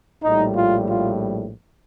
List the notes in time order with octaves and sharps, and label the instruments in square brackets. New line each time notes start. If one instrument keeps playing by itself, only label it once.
[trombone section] A#1 A2 G3 D#4
F4
F4